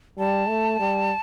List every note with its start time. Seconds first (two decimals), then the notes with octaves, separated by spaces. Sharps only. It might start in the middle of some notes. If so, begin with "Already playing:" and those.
0.18 G3 A5
0.48 A3
0.80 G3